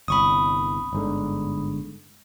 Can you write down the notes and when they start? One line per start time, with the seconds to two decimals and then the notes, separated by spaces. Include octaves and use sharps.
0.08 G1 C2 B5 C#6 D#6
0.93 G1 G#2 D3